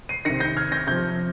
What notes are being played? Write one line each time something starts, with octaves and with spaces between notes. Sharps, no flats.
C7 D#7
C3 D#3 A#6 C#7
G6 A#6
F6 G#6
G6 A#6
C3 F3 G6 A#6